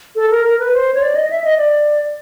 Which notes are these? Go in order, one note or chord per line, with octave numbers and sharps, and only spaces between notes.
A4
A#4
A#4
B4
C5
C#5
D5
D#5
E5
D#5
D5